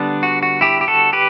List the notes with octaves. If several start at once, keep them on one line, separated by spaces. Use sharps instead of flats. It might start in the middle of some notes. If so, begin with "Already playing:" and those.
Already playing: D3 G3 B3 D4
F#4
F#4
E4 G4
G4
F#4 A4
G4 B4